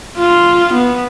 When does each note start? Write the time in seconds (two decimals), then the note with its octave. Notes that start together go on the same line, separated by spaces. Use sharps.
0.17 F4
0.74 B3